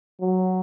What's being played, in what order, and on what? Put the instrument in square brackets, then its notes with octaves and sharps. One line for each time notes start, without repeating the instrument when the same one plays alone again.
[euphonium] F#3